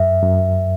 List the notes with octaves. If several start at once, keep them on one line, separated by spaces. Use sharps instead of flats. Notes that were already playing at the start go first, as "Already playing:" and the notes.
Already playing: F#2 E5
F#2